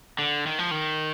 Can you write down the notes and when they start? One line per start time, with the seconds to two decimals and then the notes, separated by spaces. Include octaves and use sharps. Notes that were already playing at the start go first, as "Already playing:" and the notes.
0.19 D3
0.47 D#3
0.59 F3
0.71 D#3